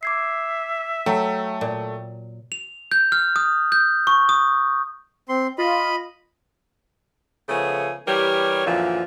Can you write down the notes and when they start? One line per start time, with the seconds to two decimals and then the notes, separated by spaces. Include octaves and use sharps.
0.03 E5 D6 G#6 C7
1.06 F#3 A3 G5
1.61 A#2
2.52 F7
2.92 G6
3.12 F6
3.36 D#6
3.72 G6
4.07 C#6
4.29 D#6
5.29 C4 C6
5.58 F4 D#5 B5
7.49 C#3 F3 A3 B3 G#4
8.07 E3 G3 G4 A#4 C#5
8.66 F#2 A#2 D3 E3 F3